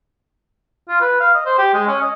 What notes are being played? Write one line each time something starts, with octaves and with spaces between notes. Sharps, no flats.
F4
B4
F5
D#5
C5
G4
G#3
C#4
D#5